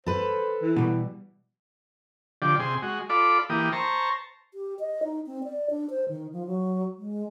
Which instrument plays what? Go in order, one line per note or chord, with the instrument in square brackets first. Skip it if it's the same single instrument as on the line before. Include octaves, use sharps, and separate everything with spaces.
[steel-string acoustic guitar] A4 B4 [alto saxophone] C5
[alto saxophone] E3
[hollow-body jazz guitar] B2 G3
[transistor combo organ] D3 F3 G4 D5
C3 G#4 C6
G#3 F#4
F4 A4 D5 B5 D6
E3 A#3 G4 D#6
C5 A5 A#5 C#6
[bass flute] G4
D#5
D#4
C4
D5
D4
C5
D#3
F3
F#3
G#3